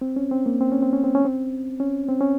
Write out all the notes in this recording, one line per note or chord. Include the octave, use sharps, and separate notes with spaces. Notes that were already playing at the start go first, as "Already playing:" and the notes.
C4
C#4
C4
A#3
C4
C#4
C4
C#4
C4
C#4
C4
C#4
C4
C#4